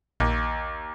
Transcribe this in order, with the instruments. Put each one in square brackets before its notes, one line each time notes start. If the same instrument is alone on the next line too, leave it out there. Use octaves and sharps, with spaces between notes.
[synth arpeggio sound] A#1 [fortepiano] D#2